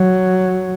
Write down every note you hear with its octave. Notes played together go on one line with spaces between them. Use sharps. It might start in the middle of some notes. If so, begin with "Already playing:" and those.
Already playing: F#3